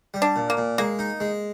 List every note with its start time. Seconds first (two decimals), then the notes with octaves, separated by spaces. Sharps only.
0.14 G3
0.22 D4
0.36 A#2
0.50 A#3
0.57 A#2
0.78 G#3 A#3
0.99 D#4
1.20 G#3